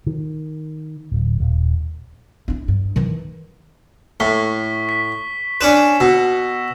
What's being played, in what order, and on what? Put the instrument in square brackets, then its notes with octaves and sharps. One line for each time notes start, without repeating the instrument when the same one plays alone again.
[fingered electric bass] D#3
D1
D#1
[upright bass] D4 E4
G2
D#3 E3
[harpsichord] A2 [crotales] C#6 B6 G7
[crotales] B6
[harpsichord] C#4 D4 B4 [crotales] B6 E7 F#7
[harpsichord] B2 [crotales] E6 A#6 B6